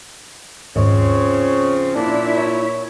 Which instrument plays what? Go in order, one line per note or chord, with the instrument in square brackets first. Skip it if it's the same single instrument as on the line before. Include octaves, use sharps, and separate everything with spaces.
[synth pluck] D#2 G#2 [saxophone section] C#3 F3 C4 [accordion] C#5
[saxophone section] A#2 [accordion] D4 [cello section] E4
[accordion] C#5